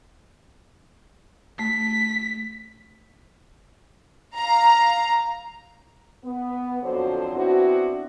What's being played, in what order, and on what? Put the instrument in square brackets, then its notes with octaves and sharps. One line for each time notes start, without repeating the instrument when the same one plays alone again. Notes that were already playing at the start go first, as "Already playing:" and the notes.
[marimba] A3 [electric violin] B6
[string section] F5 A#5
[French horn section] B3
F2 D3 F#3 F#4 C5
B3 C4 D4 E4 F#4